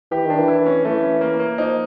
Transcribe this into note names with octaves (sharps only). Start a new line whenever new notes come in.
E3 G4
D#3 D4
E3
E4
C#4
E3 A3
C#4
A#3
A#3
F3 D#4